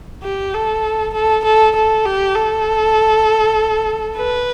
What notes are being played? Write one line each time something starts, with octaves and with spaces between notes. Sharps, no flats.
G4
A4
A4
A4
A4
G4
A4
B4